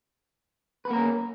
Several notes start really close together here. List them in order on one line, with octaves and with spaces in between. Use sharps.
B4 B3 A#3 A#4 C#4